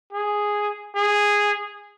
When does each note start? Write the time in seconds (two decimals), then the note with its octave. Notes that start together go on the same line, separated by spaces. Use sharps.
0.13 G#4
0.95 G#4